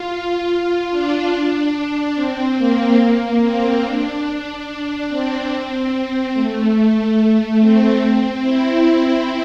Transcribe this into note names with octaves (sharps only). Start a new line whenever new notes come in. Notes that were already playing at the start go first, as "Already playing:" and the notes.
Already playing: F4
D4
C4
A#3
C4
D4
C4
A3
A3
C4
E4